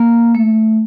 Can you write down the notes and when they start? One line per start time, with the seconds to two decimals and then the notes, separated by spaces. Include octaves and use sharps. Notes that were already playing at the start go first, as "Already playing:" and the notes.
Already playing: A#3
0.35 A3